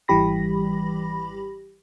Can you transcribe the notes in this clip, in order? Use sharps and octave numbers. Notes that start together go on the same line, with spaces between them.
G#1 E3 G3 G4 B5 A#6